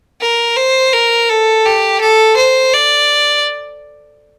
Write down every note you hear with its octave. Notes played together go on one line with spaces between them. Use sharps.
A#4
C5
A#4
A4
G4
A4
C5
D5